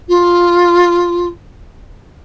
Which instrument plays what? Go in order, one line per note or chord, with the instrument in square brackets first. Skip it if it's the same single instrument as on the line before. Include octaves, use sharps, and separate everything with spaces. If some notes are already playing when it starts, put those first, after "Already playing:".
[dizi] F4